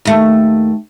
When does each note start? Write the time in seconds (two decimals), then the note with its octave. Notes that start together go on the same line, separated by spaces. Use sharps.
0.05 D#2 A3